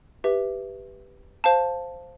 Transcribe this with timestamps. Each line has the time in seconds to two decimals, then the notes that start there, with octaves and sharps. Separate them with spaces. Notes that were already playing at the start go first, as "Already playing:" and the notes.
0.24 G4 B4 E5
1.44 C5 F5 A5